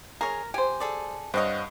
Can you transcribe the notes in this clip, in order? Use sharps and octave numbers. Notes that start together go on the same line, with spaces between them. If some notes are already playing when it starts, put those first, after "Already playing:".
G#4 A#4 C#5
G4 C5 G#5
G#4 A4 D5
G2 C4 C#5 D#5 F5 F#5